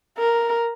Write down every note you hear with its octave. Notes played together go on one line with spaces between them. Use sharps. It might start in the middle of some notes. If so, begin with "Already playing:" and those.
A#4